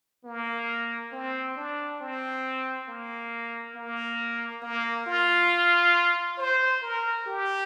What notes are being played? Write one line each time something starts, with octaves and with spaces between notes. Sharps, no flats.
A#3
C4
D4
C4
A#3
A#3
A#3
F4
C5
A#4
G4